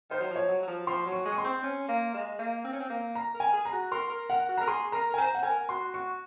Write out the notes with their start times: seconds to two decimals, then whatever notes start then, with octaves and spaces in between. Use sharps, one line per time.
0.11 D#3 C5
0.20 F#3
0.30 F3
0.36 C#5
0.49 F#3
0.62 F#3
0.68 F3
0.87 F3 C6
1.06 F#3
1.12 C#6
1.25 G#3
1.32 C#6
1.38 C6
1.44 C4
1.64 C#4
1.88 A#3
2.14 G#3
2.39 A#3
2.64 C4
2.73 C#4
2.80 C4
2.90 A#3
3.15 A#5
3.34 A#4
3.40 G#5
3.53 G#4
3.65 A#5
3.73 F#4
3.91 A#4 C6
4.10 A#4
4.30 A#4 F#5
4.49 F#4
4.57 A#4 A#5
4.67 G#4 C6
4.92 A#4 A#5
5.10 A#4
5.14 G#5
5.18 C5 A#5
5.34 F#5
5.43 A#4 G#5
5.69 F#4 C6
5.94 F#4 C#6